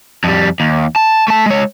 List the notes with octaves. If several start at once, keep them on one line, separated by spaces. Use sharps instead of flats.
F2 G3
D#2
A5
A3 A5
G#3 C#5